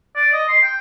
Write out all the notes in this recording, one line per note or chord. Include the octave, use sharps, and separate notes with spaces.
D5
D#5
C6
G5